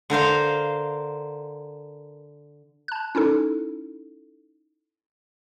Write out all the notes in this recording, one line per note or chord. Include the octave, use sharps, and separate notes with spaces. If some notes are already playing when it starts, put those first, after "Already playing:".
D3 A#4 C5 F5
A5 F#6
C#4 D#4 E4 A4